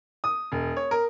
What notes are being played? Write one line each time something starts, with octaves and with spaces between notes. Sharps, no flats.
D#6
E1
C#5
A#4